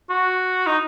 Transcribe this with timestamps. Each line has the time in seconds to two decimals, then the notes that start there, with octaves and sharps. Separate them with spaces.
0.10 F#4
0.67 D#4